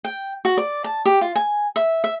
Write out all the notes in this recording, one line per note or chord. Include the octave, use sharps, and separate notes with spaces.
G5
F#4
D5
A5
G4
F4
G#5
E5
E5